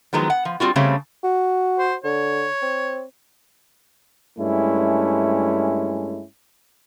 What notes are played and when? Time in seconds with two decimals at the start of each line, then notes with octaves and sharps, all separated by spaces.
0.13 D#3 F3 F#3 G#3 B3
0.30 F#5
0.45 F3
0.60 G3 C4 F4 F#4
0.76 C#3 G3 A3 C4 C#4
1.24 F#4
1.79 C5
2.04 D3 C#5
2.62 C4
4.39 G2 G#3 A3 C#4 E4